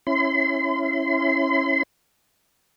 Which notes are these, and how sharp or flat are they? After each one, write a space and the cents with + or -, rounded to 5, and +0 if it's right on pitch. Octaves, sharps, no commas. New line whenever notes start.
C#4 -15 E4 +0 C6 -40